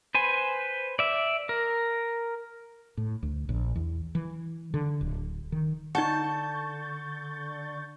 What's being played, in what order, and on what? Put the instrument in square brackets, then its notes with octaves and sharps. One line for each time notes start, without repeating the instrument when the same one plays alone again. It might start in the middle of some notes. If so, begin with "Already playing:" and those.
[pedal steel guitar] B4 C5 G#5
D5 E5
A#4
[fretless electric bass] A2
D2
A#1
E2
E3
D3
D1
D#3
[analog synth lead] D3 [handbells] D#4 F#5 [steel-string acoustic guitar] A5 [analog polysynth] C#6 G6 A6